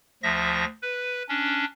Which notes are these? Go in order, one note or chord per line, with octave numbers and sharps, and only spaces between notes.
D2 F3 E5 A#6
B4
C#4 D4